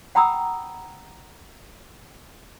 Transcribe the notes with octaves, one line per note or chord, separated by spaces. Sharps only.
F#5 G5 A#5 B5 D#6 E6